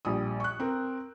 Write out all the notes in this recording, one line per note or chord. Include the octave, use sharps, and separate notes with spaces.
A#1 G3 D#6
C#6 F#6
C4 A#4